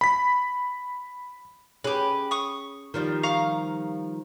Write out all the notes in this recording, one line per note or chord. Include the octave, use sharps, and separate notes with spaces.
B5 B6
C#4 G4 G#4 B4
C#6 D#6
D#3 F3 G3
F5 A#5 C#6